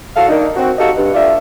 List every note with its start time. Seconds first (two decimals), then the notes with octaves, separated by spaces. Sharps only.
0.15 A2 F#4 A4 F5
0.29 D#3 A#3 D4 D#4
0.57 C4 F#4
0.79 D#4 F#4 G4 A4 D#5 F5
0.97 G2
1.15 G3 A3 D4 F4 D5 E5